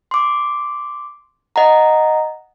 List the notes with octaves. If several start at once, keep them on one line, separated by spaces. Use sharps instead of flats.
C6 D6
D#5 F#5 A#5